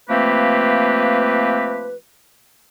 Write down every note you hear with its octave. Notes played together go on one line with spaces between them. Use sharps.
F3 A3 A#3 C4 G4 B4